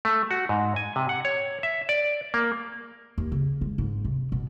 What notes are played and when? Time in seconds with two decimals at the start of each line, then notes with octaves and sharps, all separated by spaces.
0.05 A3
0.31 F#4
0.49 G#2
0.76 G#5
0.96 C3
1.09 F#5
1.25 C#5
1.63 E5
1.89 D5
2.34 A#3
3.18 D#2
3.32 C#3
3.61 G#3
3.78 G#2
4.05 C3
4.32 B2